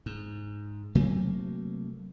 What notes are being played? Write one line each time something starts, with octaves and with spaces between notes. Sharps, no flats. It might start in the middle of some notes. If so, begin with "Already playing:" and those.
G#2
C3 F#3 A3 A#3